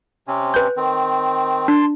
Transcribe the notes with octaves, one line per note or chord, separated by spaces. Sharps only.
C3 C4 C#4
B4 G6
D#3 C4
D4 A5 C6